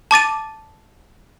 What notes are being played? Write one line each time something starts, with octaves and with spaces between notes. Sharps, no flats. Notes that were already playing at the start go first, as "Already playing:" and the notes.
A5 D6 A6 D#7